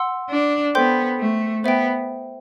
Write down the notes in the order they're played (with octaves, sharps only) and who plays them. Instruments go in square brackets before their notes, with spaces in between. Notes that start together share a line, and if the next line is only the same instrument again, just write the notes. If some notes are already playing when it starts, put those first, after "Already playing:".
Already playing: [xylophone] F#5 C6 E6
[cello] D4
[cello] B3 [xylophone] A4 C5 G5 C6 G6
[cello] A3
[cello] B3 [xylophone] C5 E5 G5